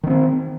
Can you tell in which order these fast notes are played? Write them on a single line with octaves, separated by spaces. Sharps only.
D#3 B3 C4